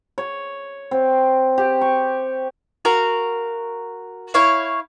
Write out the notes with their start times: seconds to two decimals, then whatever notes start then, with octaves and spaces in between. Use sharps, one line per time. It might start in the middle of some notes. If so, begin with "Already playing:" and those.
0.18 C#5
0.91 C4
1.58 G4
1.81 C#6
2.85 F#4 A#4 F5
4.34 E4 C#5 F5